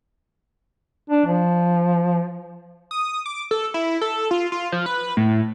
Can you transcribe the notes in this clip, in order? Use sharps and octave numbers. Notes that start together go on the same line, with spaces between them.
D4
F3
D#6
D6
A4
E4
A4
F4
F4
F3
B4
A2